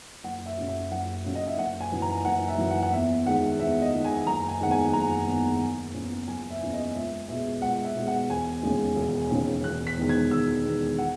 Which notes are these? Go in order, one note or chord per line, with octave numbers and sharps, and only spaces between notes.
F#1 F#5
E5
F#2 C#3
E5
F#1 F#5
F#2 C#3
D#5
E5
F#1 F#5
G#5
F#2 E3
A#5
F#1 F#5
E5
F#2 E3
F#5
F#5
E2 E5
D#3 G#3 F#5
E2 E5
D#5
D#3 G#3
G#5
F#1 A#5
G#5
E2 D#3 G#3 F#5
G#5
F#1 A#5
E2 D#3 G#3
F#1
E2 C#3
F#1 G#5
E5
E2 C#3
D#5
C#2 E5
B2 G#3 E5
C#2 F#5
E5
B2 G#3
F#5
E1 G#5
D#2 C#3 G#3
E1
D#2 C#3 G#3
E1 F#6
B6
E2 D#3 G#3
G#6
E1 E6
E2 D#3 G#3
F#5